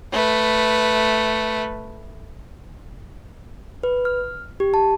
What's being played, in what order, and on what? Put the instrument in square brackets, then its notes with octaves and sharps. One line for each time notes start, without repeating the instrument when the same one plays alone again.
[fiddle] A3 B4
[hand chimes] B4
F6
G4
A5